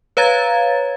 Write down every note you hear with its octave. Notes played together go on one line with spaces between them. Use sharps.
B4 C#5 F5 A#5 G#6 A6